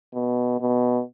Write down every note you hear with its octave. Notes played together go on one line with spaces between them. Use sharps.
B2
B2